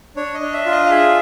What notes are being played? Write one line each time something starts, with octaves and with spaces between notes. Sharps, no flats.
D4 C#5
D#5
D4
E5
F4
D#5
F5
G#4 E5